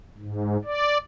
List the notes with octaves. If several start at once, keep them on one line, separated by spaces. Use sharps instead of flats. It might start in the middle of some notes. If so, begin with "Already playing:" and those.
G#2
D5